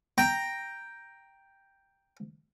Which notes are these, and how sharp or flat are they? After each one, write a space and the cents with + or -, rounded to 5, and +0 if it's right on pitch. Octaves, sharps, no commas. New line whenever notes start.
G5 +0 A#5 +0